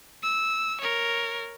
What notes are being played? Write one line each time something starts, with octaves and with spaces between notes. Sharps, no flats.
E6
A#4 C#5